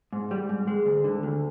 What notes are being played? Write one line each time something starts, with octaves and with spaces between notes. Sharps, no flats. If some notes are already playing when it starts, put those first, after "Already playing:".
G#2
G3
G#2
G#3
D2
D3
D2